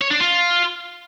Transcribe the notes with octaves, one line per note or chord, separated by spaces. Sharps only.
C#5
D4
F4